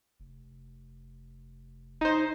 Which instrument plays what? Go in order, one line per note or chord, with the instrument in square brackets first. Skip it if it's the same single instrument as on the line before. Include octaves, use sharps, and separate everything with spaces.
[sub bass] F1
[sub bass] F1 [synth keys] D#4 C5